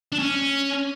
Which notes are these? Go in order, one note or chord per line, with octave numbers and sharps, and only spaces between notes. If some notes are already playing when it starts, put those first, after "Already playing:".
D4
C#4